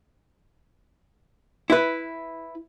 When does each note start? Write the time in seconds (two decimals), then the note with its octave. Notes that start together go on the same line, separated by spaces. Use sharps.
1.70 E4 B4